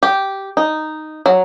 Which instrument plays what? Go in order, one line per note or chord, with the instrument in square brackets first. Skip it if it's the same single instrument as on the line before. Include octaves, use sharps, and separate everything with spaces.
[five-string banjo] G4
D#4
F#3